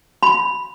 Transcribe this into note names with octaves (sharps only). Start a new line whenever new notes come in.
B5